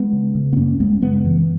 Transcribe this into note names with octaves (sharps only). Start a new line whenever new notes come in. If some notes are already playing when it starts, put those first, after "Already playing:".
Already playing: G#3 B3
C#3
C#3
B3
F#2 A#3 C#4
F#2 G#3 B3
C#3 G#3 B3
F#2 E3